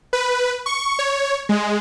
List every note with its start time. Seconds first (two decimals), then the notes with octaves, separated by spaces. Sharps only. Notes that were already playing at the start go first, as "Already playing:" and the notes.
0.13 B4
0.66 C#6
0.99 C#5
1.49 G#3